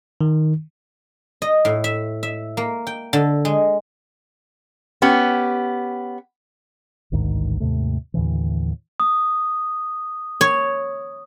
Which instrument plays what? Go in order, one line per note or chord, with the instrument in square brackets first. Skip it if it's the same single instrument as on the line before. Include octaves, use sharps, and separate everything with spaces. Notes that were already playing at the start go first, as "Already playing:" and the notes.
[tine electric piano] D#3
[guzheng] D#5
A2
E5
E5
A#3
G5
D3
G#3
[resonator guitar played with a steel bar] B3 C#4 G4
[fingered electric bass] A1 D2 G#2 D#3
D#2 G#2 C3 A3
D#2 A2 D3 E3
[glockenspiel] D#6
[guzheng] C#5